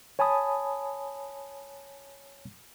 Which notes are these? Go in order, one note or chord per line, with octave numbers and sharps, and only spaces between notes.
C#5 G#5 A5 B5 D#6